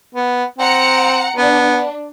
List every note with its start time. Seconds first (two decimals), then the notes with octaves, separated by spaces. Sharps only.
0.15 B3
0.58 C4 F#5 A#5 C#7
1.36 B3 D4